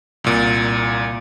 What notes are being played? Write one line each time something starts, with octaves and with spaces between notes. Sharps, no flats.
C2 A#2